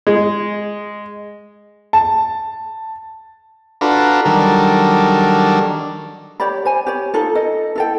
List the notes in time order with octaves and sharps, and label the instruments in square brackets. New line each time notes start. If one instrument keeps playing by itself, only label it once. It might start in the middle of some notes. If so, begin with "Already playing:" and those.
[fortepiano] G#3
[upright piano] A5
[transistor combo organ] D4 F4 F#4 A4 B4 A#5
D#3 F#3 G3 D4 A4 A#4
[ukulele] G4 C#5 D5 B5
C5 G#5
G4 C#5
D#4 F4 A4
A4 D#5
E4 A4 G5